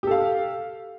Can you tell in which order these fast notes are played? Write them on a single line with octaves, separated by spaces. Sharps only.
G4 A4 F5